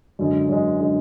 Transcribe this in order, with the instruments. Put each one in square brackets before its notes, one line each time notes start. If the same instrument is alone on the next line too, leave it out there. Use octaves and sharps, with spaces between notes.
[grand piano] F#2 D3 G#3
F#2 D3 G#3
D3 G#3